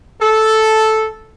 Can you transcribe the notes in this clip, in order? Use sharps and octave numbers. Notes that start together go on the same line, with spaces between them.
A4